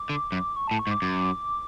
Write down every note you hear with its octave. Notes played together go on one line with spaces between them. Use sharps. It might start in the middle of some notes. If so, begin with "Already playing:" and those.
Already playing: D6
D3
F#2
C#6
A2 A5
C#6
G#2
D6
F#2 D6